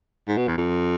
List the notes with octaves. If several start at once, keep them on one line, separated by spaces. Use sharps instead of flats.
G#2
B2
E2
F2